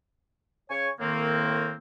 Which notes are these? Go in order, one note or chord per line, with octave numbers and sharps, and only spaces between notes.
C#3 C#5 G#5 C#6
A2 D#3 A#3 C4